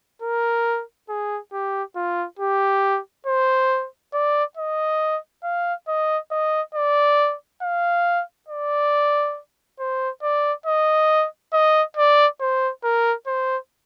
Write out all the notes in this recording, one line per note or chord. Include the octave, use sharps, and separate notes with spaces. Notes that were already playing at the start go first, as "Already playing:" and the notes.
A#4
G#4
G4
F4
G4
C5
D5
D#5
F5
D#5
D#5
D5
F5
D5
C5
D5
D#5
D#5
D5
C5
A#4
C5